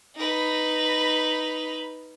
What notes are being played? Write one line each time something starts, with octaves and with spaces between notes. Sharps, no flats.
D#4 B4